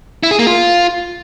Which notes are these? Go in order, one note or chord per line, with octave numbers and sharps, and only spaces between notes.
E4
G#4
A#3
F4